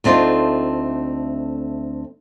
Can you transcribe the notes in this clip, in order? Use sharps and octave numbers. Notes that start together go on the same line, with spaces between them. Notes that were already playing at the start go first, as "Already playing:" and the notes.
D2 A3 C4 D4 D#4 F4